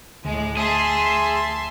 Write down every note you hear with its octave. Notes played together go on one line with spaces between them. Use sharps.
D2 A2 G#3
G#4 E5 A5 C6